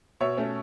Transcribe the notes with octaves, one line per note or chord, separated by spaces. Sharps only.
B2 C#5 E5
A3 C#4